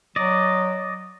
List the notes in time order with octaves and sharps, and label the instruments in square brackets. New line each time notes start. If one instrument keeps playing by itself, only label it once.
[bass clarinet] F#3 [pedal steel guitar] D5 D#5